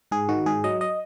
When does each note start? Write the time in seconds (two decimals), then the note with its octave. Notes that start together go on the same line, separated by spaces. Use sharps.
0.11 G#2 G#4
0.29 D#3 F#4
0.46 G#2 G#4
0.64 F#3 D#5
0.81 D#5